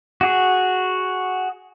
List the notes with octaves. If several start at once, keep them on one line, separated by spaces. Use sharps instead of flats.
F#4 G#4